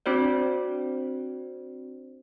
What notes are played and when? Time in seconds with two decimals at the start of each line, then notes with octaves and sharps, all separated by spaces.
0.06 C4 D4 F#4 C5 D5